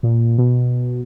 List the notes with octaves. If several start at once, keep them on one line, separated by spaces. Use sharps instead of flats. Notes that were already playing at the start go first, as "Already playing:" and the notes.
A#2
B2